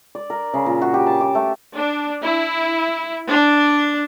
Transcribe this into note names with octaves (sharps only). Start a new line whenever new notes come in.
D5
A#4
C#3
A#2
F#4
G4
A5
D6
A3
D4
E4
D4